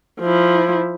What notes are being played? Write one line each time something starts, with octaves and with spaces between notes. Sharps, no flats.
F3 E4